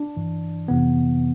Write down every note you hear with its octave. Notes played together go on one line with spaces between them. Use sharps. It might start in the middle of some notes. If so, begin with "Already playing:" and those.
Already playing: D4
G2 E3
F2 C3 E3 B3